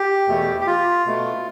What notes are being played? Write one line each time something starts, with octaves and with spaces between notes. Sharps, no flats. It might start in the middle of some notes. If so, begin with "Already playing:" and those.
Already playing: G4
E2 B2 A3
G4
F4
B2 A3